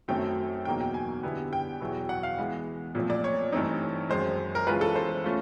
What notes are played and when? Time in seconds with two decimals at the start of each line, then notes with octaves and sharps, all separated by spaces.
0.08 F#2 D#3 F#3 A3 C4 G5
0.65 E2 B2 F#3 A#3 D#4 G5
0.81 G5
0.94 G#5
1.23 D3 G3 B3 E4
1.53 G5
1.81 E2 B2 F#3 B3 E4
2.09 F#5
2.23 F5
2.38 E3 G#3 B3
2.95 A#2 F3 A3 C4
3.10 D5
3.24 C#5
3.52 G2 E3 A3 C4 D#4
4.09 F#2 D#3 G#3 C5
4.55 A#4
4.67 E3 G#3 C#4 F4 B4
4.81 A4
4.96 C5
5.24 A3 C#4 F4